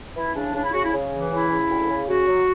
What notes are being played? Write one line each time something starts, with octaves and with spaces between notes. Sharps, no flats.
E3 E4
C#3 D4
C#3 D4
E4
C#3 F#4
E4
C#3
E3
C#3 E4
C#3
D2
C#3
C#3 F#4
F#3